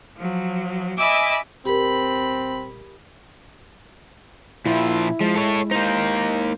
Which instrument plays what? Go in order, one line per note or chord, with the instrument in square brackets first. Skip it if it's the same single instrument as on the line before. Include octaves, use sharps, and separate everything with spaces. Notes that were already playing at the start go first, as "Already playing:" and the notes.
[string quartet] F3 F#3
D#5 E5 G#5 B5 D6 E6
[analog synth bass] D#1 [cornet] C4 [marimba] G4 A#4 [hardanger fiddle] B5
[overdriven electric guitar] A#2 F3 [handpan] E4
[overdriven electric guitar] F3 [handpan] G#3
[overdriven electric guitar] A4 C#5
[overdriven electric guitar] A#3 D#4 [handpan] C5